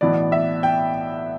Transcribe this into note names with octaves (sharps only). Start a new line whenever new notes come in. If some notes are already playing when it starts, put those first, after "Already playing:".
B1 A2 E3 B3 D5
E5
G5